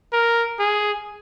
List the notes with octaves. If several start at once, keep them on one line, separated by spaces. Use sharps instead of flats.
A#4
G#4